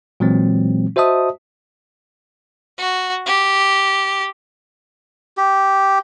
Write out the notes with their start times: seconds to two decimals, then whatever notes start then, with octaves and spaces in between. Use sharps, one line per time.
0.20 A#2 E3 F#3 G#3 C4
0.96 F#4 C5 D#5 E5 A5 D#6
2.78 F#4
3.26 G4
5.37 G4